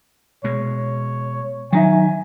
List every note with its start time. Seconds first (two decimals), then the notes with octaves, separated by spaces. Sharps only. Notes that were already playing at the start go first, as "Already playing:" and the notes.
0.44 B2 G#3 C#5
1.73 D#3 F#3 D#4 E5 G#5